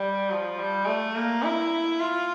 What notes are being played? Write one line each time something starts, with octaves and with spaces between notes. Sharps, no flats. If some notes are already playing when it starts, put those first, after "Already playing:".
Already playing: G3
F3
G3
A3
A#3
E4
F4